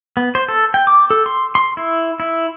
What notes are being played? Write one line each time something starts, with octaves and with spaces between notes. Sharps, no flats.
B3
C5
A4
G5
D6
A4
C6
C6
E4
E4